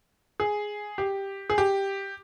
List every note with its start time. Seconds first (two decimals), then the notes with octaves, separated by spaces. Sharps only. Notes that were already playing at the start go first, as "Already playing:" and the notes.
0.40 G#4
0.98 G4
1.50 G#4
1.58 G4